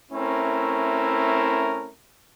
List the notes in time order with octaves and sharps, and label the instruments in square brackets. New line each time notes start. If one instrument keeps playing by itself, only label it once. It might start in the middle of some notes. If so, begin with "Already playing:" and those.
[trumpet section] A3 C4 C#4 E4 A#4